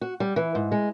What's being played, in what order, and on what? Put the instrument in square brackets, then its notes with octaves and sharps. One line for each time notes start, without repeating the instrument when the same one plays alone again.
[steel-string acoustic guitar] F#4
G3
E3
G#2
G#3